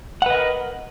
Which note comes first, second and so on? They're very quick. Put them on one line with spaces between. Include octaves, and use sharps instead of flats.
F#5 B4 D#5 A#4